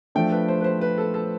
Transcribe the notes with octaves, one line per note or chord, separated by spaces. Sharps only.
F3 A3 D4 G5
B4
C5
B4
C5
B4
A4
A4